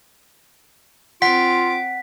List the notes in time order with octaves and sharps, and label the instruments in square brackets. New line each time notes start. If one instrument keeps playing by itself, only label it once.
[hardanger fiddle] C4 D6 [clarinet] F4 [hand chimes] F#5 [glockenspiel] B6